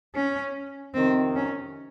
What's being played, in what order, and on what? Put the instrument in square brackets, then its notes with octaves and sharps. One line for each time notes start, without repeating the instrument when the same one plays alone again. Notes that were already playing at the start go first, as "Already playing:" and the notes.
[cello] C#4
[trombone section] F2 C3 D#3 [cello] C4
[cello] C#4